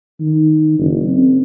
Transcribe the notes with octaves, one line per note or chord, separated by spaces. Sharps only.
D#3
F#1
C4